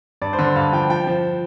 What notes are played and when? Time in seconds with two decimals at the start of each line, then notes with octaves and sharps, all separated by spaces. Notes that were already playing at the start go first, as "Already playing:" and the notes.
0.22 G2 D5
0.33 C5
0.39 D3
0.44 C5
0.56 G2 F5
0.72 F3 G5
0.90 F3 G5
1.07 F3